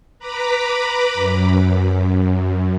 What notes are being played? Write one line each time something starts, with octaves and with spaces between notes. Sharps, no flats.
B4 A#5 B5 D6
F#2